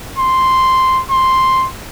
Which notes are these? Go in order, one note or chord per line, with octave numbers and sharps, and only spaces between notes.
C6
C6